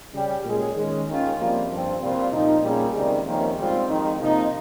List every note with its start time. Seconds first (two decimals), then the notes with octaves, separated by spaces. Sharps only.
0.14 C#3 G3 C#4 G4
0.45 A#2 G#3 C#4 G#4
0.76 D#3 G#3 C#4 G#4
1.08 D#2 D#3 G#3 C#4 F4
1.38 F2 C3 G3 A#3 F4
1.70 G2 F3 C4
2.01 C2 A#2 G3 C4 F4
2.32 A#2 F3 C4 D#4
2.62 A#2 G3 A#3 C#4 G#4
2.94 C#2 C3 D#3 G3
3.25 F2 C3 D#3 A#3 C#4
3.56 G#2 G3 C4 F4
3.88 F2 D#3 G#3 D#4
4.18 C3 F3 A#3 D#4